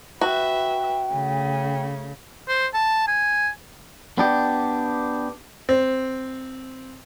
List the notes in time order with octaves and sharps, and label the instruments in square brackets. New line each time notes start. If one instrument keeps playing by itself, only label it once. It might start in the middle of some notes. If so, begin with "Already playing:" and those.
[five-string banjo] F#4 [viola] B4 E5 [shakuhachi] G5
[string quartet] C#3 [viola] A3
[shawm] C5
A5
G#5
[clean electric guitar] B3 D4 G4
[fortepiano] C4